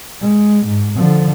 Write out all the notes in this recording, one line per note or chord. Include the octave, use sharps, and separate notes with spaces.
G#3
G#2
D3 F3